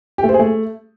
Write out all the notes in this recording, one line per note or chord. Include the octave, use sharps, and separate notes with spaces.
G4
A3
C5
G#4
A3